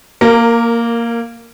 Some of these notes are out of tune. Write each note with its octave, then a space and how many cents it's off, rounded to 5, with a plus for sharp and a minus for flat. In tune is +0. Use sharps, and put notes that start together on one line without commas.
A#3 +0 A#4 -20